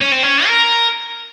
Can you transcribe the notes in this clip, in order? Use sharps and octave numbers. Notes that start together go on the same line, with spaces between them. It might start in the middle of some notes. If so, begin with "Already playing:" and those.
C#4
C4
C#4
A#4